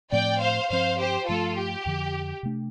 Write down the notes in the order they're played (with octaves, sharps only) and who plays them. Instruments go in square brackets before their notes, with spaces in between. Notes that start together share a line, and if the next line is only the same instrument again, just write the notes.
[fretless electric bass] A2 F3 A3 C4 [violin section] D5 G5
[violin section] C5 F5
[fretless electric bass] G2 F3 C4 [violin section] C5 F5
[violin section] G4 C5
[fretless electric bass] G2 F3 A3 [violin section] F4 A4
[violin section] G4
[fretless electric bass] F2 D3 F3
C3 A3 D4